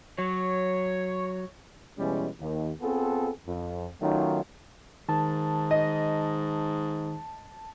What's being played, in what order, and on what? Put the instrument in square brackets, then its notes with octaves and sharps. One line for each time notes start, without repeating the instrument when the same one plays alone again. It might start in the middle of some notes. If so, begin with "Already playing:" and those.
[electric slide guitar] F#3 [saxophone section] C#5
[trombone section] B2 E3 G3 G#3 C#4
D#2
B3 C4 F4 G#4 A4
F2
D#3 F#3 A3 C#4 D#4 F4
[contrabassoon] G#2 [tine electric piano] D#3 [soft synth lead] A5
[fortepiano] D#5